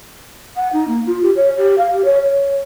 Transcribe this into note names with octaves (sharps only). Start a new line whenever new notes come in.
F#5
D#4
A#3
F4
G4
C#5
G4
F5
G4
C#5
C#5